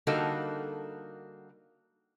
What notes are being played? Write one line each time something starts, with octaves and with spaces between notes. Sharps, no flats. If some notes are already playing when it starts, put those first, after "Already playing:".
D3 G3 A#3 D#4 F#4 A4